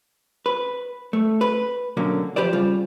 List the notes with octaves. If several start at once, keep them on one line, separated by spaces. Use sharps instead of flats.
B4
A3
B4
B2 D3 F#3 A#3 C#4
F3 G4 B4 C5 D5
C#3 G3 F4